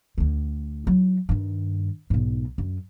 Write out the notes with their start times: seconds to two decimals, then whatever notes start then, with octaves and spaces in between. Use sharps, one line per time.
0.18 D2 D3
0.87 F#3 E4
1.29 G2 D#3
2.10 B1 G#2
2.58 F#2